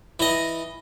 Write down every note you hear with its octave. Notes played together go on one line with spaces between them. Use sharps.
E3 D#5